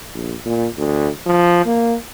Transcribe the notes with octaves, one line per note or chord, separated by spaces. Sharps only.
A#1
A#2
D2
F3
A#3